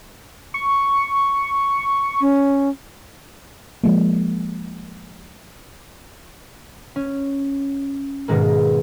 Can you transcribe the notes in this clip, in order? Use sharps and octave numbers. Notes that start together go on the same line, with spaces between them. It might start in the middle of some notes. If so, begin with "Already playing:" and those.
C#6
C#4
F3 G#3 A#3
C#4
G#2 B2 D#3 G#3 A#3